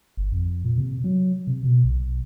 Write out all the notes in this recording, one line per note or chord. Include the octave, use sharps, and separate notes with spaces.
G1
F2
A#2
C3
F#3
C3
B2
B1